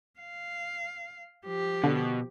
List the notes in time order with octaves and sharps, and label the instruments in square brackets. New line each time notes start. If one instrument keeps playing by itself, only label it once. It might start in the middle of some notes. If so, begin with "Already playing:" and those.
[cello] F5
F3 G4
[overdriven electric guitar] B2 [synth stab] D3